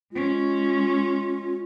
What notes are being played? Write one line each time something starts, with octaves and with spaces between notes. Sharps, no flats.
G#3 C#4 F4